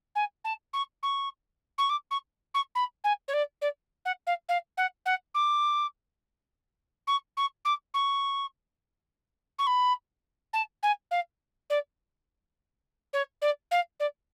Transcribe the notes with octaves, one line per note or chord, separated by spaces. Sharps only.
G#5
A5
C#6
C#6
C#6
D6
C#6
C#6
B5
G#5
C#5
D5
D5
F#5
F5
F5
F#5
F#5
D6
C#6
C#6
D6
C#6
C#6
B5
A5
G#5
F5
D5
C#5
D5
F5
D5